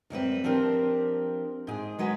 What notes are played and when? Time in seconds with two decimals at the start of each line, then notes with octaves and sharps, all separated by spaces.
0.10 F#2 G3 C4 B4
0.44 F3 C4 D4 G4 A#4
1.67 G#2 G#4
1.99 F#3 G#3 F#4 B4